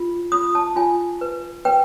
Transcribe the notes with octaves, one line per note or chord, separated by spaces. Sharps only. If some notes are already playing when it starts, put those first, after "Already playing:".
Already playing: F4
F4 D#6
A5
F4 G#5
B4
B4 G5